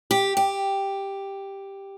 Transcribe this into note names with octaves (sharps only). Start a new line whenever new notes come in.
G4
G4